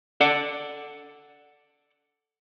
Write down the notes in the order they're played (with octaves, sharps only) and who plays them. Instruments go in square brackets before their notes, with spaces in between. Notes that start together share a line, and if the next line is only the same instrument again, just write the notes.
[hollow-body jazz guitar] A4 D5 F#5